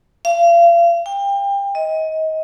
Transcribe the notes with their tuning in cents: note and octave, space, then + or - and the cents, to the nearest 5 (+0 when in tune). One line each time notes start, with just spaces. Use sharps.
F5 -35
G5 +30
D#5 +25